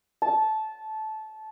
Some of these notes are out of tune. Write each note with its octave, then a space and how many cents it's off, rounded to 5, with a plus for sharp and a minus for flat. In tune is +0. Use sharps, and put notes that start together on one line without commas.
A5 -15